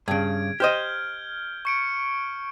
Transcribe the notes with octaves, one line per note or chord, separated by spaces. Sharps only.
G2 C#3 G#6 D7
G4 C5 D#5 F6 G6 G7
C#6 C#7 D7